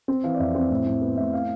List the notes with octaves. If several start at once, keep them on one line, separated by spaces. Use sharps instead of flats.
C4
E3 F5
D5
F2 E5
C4
A2
A2
B3
A2 E5
F5